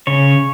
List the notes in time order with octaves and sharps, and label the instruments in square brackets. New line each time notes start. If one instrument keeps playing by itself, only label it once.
[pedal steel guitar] C#3 C#5